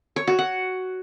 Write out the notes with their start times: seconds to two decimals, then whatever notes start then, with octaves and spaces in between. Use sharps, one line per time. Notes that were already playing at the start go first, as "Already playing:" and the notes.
0.16 C#5
0.27 F#4
0.39 F#5